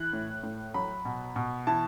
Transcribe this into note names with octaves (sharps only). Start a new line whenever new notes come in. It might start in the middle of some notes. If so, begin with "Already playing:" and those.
Already playing: E3 F#6
A2
A2
F#3 B5
B2
B2
E3 A5